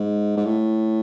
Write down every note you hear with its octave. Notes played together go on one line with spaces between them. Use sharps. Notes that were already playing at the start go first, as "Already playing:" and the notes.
Already playing: G#2
G#2
A2